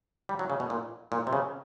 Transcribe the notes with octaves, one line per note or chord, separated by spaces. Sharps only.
G3
F#3
C#3
B2
A#2
A#2
C3
C#3